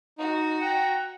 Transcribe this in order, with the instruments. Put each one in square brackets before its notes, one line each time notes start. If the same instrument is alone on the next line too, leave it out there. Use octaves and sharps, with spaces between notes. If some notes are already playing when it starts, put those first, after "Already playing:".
[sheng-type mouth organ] D#4 [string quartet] F#4
[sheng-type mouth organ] F#5 G5 A#5